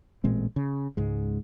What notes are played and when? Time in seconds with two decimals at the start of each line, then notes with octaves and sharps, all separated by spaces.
0.24 A1 A#2 G#3 C4
0.56 C#3
0.97 C#2 G#2 G#3